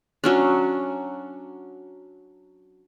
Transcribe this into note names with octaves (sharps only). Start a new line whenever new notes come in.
F#3 C#4 D4